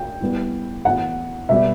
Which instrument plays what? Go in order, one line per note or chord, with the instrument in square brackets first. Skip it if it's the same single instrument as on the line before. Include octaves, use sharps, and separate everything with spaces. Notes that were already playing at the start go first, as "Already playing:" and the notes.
Already playing: [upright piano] G5
A2 G3 B3
A2 E3 B3 F#5
B2 G3 B3 E5